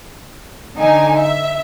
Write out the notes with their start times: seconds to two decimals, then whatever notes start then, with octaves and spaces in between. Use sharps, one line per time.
0.76 D3 D#4 G#5
1.16 E5